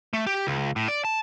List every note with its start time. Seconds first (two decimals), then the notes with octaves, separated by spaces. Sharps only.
0.13 A3
0.27 G4
0.47 C#2
0.76 A2
0.88 D5
1.05 A5